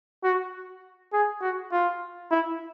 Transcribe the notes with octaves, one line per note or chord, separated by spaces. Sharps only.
F#4
G#4
F#4
F4
E4